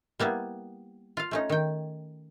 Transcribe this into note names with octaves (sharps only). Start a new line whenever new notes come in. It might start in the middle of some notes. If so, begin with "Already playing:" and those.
G3 A#3 B3 E4
F4 F5
A3 C#4 D#4
D#3 G5